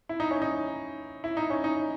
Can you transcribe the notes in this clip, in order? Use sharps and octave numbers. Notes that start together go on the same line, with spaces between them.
E4
D#4
C#4
D#4
E4
D#4
C#4
D#4